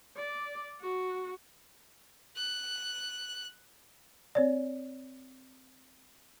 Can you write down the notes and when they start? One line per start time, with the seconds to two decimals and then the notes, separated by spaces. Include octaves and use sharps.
0.17 D5
0.81 F#4
2.36 F#6
4.35 C4 C#5 D5